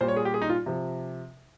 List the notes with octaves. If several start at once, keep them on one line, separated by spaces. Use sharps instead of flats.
A#2 G3 C5
C#5
G#4
G4
G#4
D#4
F4
C3 F3